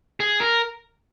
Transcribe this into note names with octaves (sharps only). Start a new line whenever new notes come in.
G#4
A#4